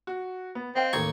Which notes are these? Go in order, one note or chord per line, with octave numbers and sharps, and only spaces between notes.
F#4
B3
C4 D#5 F5 G5
A1 D#2 A#5 C#6 G#6